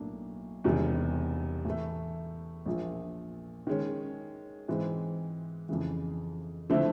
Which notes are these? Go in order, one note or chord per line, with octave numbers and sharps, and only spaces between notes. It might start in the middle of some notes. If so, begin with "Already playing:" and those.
Already playing: B1 A2 F#3 A#3 D4
E1 E2 C3 D#3 G3
A2 E3 A3
A#1 A#2 F3
D#3 G#3 C#4
G#2 E3 G#3 C4
F2 C#3 E3
D3 F3 A3 C4 E4